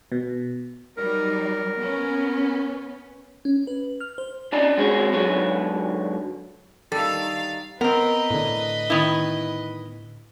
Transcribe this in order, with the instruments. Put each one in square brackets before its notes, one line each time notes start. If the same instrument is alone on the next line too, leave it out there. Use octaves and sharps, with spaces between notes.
[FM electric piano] B2
[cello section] F#3 G3 D#4 [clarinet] A#4
[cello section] B3 C#4
[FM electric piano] C#4
B4
F6
C5
[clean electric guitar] C#4 D4 D5 D#5 A#5
G#3 C4 F#4 G#4 C#5
G#2 D3 F#3 B4 C#5
[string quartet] D#3 F5 [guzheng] G3 [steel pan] A4 [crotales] A6
[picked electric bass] B3 [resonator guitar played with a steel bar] C4 A#4 [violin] B4 D#5
[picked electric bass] A2 D3
[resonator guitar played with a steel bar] D#3 B3 E4